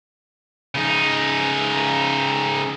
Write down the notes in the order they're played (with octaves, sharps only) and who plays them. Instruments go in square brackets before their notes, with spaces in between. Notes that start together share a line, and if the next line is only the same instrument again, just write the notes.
[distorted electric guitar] C#3 D#4